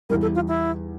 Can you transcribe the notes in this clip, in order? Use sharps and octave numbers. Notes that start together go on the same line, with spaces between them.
E2 E3 G3 A#4
A4
F4
E4